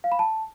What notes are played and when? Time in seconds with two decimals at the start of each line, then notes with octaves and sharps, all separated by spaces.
0.04 F5
0.12 B5
0.19 A5